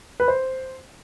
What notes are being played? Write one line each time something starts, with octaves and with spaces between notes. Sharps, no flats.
B4
C5